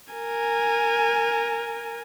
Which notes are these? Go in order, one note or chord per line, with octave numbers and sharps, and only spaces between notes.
A#4 G#5